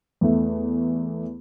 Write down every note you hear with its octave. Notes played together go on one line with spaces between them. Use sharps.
E2 A3